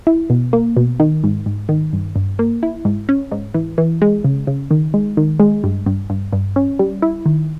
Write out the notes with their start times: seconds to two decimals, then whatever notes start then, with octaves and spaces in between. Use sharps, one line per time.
0.07 E4
0.30 B2
0.53 A#3
0.77 B2
1.00 D#3
1.24 G#2
1.46 G#2
1.69 D#3
1.93 G2
2.16 G2
2.39 A#3
2.63 E4
2.85 G#2
3.09 C#4
3.31 G#2
3.54 E3
3.78 E3
4.02 G#3
4.24 C#3
4.47 C#3
4.71 D#3
4.94 G#3
5.17 D#3
5.40 G#3
5.64 G2
5.86 G2
6.10 G2
6.33 G2
6.56 C#4
6.79 G3
7.02 E4
7.26 D#3